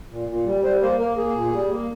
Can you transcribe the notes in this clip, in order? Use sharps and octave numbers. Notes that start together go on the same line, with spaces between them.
A#2
A#2
G3
G3 C5
A#3 C5
A#3 A#4
A#3 G#4
A#2
G3
A#3